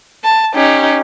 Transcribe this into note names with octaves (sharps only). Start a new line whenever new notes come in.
A5
C#4 D#4 G4